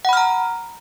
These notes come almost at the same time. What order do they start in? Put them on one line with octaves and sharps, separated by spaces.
F#5 B5 F6 A#5